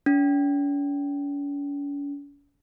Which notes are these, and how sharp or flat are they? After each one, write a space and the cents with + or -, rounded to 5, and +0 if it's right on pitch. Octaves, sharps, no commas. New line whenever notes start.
C#4 +45